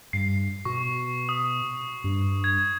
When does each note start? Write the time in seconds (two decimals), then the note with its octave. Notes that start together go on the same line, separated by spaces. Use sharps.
0.13 G2 C7
0.65 B2 C#6
1.29 D#6
2.04 G2
2.44 G#6